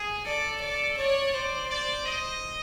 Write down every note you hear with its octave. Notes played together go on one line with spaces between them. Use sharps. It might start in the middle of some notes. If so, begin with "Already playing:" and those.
Already playing: G#4
A4 D5
D5
C#5 D5
C5
D5
D#5